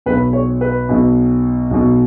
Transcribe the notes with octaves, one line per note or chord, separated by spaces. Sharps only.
B1 B2 B4
C#5
B4
B1 B2
B1 B2